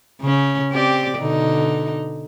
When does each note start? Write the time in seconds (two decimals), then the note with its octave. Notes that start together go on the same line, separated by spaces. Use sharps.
0.21 C#3 C#4
0.72 C4 G4 D5
1.18 B2 D3 D#4